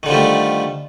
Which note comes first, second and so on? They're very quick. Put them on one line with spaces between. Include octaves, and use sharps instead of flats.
D#3 D3 F3 G3 A3